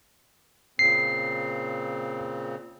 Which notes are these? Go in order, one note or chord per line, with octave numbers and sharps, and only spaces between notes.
A#2 C#3 C4 C7